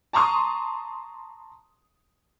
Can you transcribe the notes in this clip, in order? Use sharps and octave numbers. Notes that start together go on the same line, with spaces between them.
A5 A#5 C6 C#6 D#6